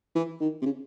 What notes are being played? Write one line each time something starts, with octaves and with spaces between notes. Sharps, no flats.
E3
D#3
C3
C#3